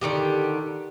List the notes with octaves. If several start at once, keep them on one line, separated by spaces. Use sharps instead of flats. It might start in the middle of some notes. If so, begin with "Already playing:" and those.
D3 D#3 G#3 G4